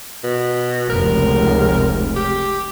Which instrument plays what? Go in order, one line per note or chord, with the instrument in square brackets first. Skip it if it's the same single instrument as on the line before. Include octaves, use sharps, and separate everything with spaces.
[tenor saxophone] B2
[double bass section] F1 C#2 [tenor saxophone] A#4
[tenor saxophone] G4